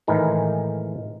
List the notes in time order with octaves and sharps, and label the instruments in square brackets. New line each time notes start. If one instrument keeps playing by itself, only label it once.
[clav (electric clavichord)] A2 D#3 E3 G#3 A#4 A#5